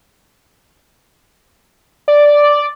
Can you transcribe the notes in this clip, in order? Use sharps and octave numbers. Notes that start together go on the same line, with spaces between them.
D5